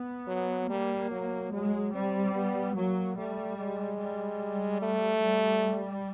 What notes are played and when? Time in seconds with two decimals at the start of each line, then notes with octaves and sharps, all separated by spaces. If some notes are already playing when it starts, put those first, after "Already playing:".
Already playing: B3
0.28 F#3
0.69 G3 A#3
1.11 F#3
1.52 F#3 G#3
1.94 G3 C4
2.34 B3
2.76 F#3 A#3
3.17 G3 A3
3.58 G#3
4.00 G3
4.82 A3
5.24 G3